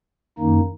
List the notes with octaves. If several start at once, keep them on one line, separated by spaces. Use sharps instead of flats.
F#2 D#3 A#3 D#4